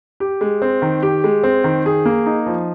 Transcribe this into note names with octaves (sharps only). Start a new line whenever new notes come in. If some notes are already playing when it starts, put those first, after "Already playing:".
G4
G#3
C4
D#3
G4
G#3
C4
D#3
G#4
A#3
D#4
F3